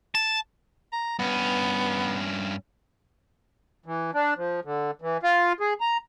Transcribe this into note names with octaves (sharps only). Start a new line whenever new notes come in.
A5
A#5
G2 B3 C#4
E3
D4
F3
D3
E3
F4
G#4
A#5